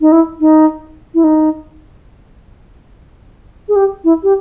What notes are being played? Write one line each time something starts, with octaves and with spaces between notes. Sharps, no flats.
D#4
E4
D#4
E4
D#4
G#4
G4
E4
G4